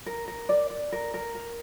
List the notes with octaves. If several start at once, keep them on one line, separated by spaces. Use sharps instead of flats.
A#4
A#4
D5
D5
A#4
A#4
A#4